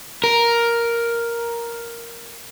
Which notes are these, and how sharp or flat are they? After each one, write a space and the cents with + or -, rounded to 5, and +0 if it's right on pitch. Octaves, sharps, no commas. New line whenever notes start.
A#4 +5